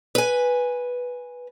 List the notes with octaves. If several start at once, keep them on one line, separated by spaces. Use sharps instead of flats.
B4 G#5